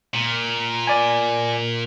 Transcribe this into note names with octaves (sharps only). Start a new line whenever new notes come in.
A#2
D5 G#5